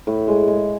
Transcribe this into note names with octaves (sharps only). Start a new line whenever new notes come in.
A2
G#3
G#3